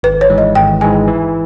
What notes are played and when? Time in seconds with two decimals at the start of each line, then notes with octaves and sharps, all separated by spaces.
0.03 G#1 B4
0.21 C#5
0.30 G#2 E3 G#3
0.38 D#5
0.55 G#1 G5
0.81 G#2 E3 G#3 G#5
1.08 E3